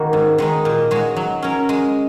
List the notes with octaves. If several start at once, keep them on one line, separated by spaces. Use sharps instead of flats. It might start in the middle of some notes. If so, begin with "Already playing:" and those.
Already playing: D#3 A#3 F#4
G#2
D#3 G#3 D#4
A#2
G#3 F#4 C#5
F#3
C#4 A#4 C#5
G#3